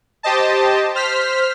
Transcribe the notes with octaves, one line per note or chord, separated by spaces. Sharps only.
G4 C5 D#5 A5
C5 F6 B6